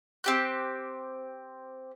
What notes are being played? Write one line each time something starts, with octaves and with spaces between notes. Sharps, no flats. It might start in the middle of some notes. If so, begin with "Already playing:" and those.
C4 G4 F#6